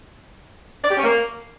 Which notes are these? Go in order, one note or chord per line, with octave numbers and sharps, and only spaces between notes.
D5
G4
C#4
A#3